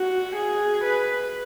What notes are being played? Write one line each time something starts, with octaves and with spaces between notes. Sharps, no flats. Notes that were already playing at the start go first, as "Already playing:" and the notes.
Already playing: F#4
G#4
B4